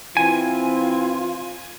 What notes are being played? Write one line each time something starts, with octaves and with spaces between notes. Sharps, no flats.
E3 C4 F4 G#5